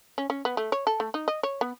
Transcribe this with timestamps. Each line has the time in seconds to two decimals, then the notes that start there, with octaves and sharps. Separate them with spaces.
0.18 C#4
0.30 C#4
0.45 B3
0.57 A3
0.72 C#5
0.87 A4
1.00 A3
1.14 D#4
1.28 D#5
1.43 C#5
1.61 B3